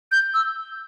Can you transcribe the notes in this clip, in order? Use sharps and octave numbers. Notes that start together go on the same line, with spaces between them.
G6
E6